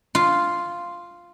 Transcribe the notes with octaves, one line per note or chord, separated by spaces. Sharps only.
F4